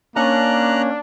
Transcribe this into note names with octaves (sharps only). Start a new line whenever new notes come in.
A#3 C#4 D4 A#5 F#6